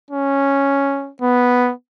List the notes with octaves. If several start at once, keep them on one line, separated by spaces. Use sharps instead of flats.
C#4
B3